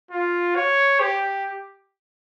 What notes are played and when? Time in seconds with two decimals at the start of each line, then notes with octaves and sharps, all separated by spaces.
0.11 F4
0.56 C#5
1.00 G4